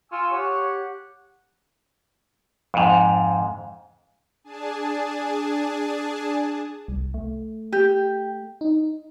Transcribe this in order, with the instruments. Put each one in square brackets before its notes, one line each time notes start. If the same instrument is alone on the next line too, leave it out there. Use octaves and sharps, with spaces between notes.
[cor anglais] F4 [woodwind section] G#5 C#6 E6
[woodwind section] G4 F#5 [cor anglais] C#5
[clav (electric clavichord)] F2 G#2
[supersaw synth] D4 G#4 G#5 A5
[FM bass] C2
A3
[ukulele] G4
[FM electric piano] D#4